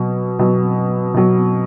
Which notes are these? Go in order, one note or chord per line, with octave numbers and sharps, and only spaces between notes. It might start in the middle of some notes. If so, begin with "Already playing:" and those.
Already playing: B2 F#3
B2 F#3
B2 F#3